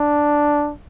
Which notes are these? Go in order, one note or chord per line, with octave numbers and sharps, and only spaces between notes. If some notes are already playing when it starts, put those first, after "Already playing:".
Already playing: D4